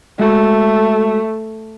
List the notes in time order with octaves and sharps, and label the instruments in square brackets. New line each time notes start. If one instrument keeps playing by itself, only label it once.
[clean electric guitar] G#3 F#4 B5 [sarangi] A3